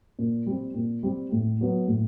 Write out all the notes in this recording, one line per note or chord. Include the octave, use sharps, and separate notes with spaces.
A#2
G3 C4
A#2
G3 C4
A2
F#3 B3
A2